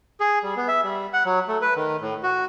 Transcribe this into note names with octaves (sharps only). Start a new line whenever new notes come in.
G#4
G3
B3
E5
G3
F#5
F#3
A3
B4
D#3
A2
F#4